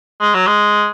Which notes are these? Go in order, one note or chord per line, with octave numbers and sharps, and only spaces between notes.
G#3
F#3
G#3